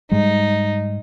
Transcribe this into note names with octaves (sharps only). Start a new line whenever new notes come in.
G#2 G3 G#3 D#4